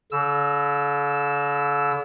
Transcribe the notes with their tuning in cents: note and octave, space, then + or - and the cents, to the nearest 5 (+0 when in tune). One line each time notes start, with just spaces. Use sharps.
D3 -45 E6 +0